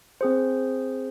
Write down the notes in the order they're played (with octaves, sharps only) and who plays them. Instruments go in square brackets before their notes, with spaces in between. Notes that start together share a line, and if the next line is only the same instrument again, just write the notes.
[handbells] C4 G#4 C5